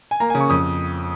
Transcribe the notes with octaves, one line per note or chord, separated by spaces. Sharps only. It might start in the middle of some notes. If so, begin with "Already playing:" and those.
G#5
A#3 A#5
G#5
C#3
C#6
F2 D#6